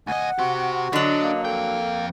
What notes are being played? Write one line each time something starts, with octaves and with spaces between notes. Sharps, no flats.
D2 D#5 F#5 G#5
F#4 G4 C5
D3 F#3 D4 D#5
A#3
F2 A4 G5